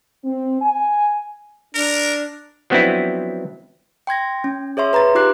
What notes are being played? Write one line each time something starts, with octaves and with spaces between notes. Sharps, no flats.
C4
G#5
D4 A#4
F3 F#3 B3 C4 D4 E4
G5 C6 G#6 A#6
C#4
G#4 C#5 E5 C6
B4 A#5 C6 A6
D#4 F4 G4 D6 F#6 C7